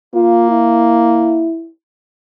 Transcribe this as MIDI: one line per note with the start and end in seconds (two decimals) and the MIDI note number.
0.15 1.50 58
0.15 0.49 65
0.50 1.70 64